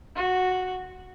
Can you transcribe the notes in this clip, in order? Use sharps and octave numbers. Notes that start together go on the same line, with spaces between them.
F#4